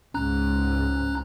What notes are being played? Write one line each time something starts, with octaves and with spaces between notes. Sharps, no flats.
C#2 G#2 C#4 A#5 F#6